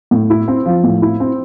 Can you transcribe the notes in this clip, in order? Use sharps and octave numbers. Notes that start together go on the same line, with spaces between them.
A2
E4
C4
F3
A2
E4
C4